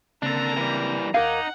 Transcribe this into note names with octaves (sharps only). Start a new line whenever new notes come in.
C#3 A#3 C4 D4 A4 A#4 A#5
E3 G3
D#2 D#4 A#4 F5 F#5 D6 G#6